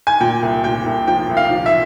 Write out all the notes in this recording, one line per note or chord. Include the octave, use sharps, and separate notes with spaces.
G#5
A#2 G5
C2
A#2 G5
C2
F3 G5
C2
F5
F3
E5